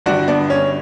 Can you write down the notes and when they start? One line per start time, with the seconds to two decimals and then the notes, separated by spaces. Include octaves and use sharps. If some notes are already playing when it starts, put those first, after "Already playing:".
0.06 G1 G2 D3 G3 D4 F#4
0.28 B3 D4
0.50 C#4